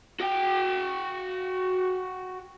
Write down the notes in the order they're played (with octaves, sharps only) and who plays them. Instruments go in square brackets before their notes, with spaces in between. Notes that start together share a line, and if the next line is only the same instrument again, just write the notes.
[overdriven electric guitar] F#4 G5